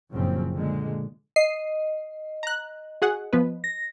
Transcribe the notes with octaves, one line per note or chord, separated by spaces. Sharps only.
F#1 F#2 A#2 C#3 F3 C4
A#2 D3 G#3
D#5 C7
A#5 F#6
F#4 G#4 F#5
F3 B3 B4
A#6